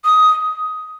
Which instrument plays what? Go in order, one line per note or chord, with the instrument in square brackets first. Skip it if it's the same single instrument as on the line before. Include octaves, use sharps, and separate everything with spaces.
[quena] D#6